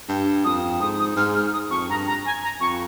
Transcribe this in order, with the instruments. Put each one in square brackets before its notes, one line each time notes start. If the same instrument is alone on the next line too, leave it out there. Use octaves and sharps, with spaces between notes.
[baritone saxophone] G2
[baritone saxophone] F2 [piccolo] D#6
[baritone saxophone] G#2 [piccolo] D#6
[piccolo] D#6
[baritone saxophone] G#2 [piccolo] F6
[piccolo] F6
F6
D#6
[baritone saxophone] F2 [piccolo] C#6
[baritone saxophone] G2 [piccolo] A#5
[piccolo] A#5
G#5
A#5
[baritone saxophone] F2 [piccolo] C#6